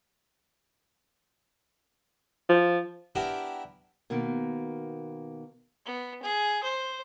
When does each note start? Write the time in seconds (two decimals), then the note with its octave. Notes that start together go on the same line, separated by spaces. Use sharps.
2.49 F3
3.15 B3 D4 E4 G4 A#4
4.10 B2 D#3 A#3
5.86 B3
6.22 G#4
6.63 C5